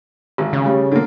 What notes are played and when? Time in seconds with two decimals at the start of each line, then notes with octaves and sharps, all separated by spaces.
0.38 G#1
0.53 C#3
0.66 G3
0.92 D3 A#3